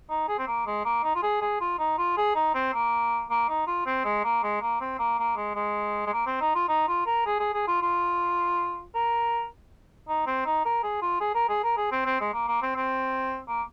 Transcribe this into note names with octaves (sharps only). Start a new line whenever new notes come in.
D#4
G#4
C4
A#3
G#3
A#3
D#4
F4
G#4
G#4
F4
D#4
F4
G#4
D#4
C4
A#3
A#3
D#4
F4
C4
G#3
A#3
G#3
A#3
C4
A#3
A#3
G#3
G#3
G#3
A#3
C4
D#4
F4
D#4
F4
A#4
G#4
G#4
G#4
F4
F4
A#4
D#4
C4
D#4
A#4
G#4
F4
G#4
A#4
G#4
A#4
G#4
C4
C4
G#3
A#3
A#3
C4
C4
A#3